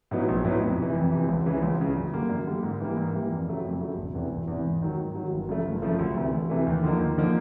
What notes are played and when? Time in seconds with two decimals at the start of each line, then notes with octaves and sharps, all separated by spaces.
0.11 A2 F#3 B3 D#4
0.28 A#1
0.45 A2 F#3 B3 D#4
0.61 F2
0.79 C3 E3
0.95 F2
1.12 C3 E3
1.28 C#2
1.46 C#3 E3
1.62 C#2
1.79 C#3 E3
1.96 F#2
2.13 D3 G3 A#3
2.30 F#2
2.46 D3 G3 A#3
2.63 G#2
2.80 E3 G3 A#3
2.97 G#2
3.14 E3 G3 A#3
3.31 F2
3.47 C#3 F#3 A3
3.64 F2
3.81 C#3 F#3 A3
3.97 E1
4.15 E2 C3 E3
4.31 E1
4.48 E2 C3 E3
4.65 G#2
4.82 D#3 F#3
4.98 G#2
5.15 D#3 F#3
5.32 G1
5.49 F#2 C#3 F3 A3
5.66 G1
5.82 F#2 C#3 F3 A3
5.99 D2
6.17 C3 E3 A3
6.33 D2
6.50 C3 E3 A3
6.66 D#2
6.83 D3 F3 A#3 D#4
6.99 D#2
7.17 D3 F3 A#3 D#4